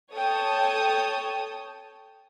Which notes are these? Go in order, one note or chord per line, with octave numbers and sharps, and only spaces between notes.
A4 C#5 G5 A5 D#6